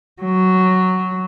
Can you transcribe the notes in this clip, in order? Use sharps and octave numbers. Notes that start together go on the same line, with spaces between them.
F#3